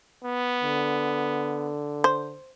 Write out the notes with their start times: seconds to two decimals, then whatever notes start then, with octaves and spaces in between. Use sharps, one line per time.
0.24 B3
0.63 D3
2.04 C5